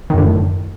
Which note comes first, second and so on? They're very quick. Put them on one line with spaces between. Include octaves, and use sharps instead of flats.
D#3 F#2 D3 A2